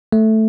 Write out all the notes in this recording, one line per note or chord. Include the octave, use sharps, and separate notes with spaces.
A3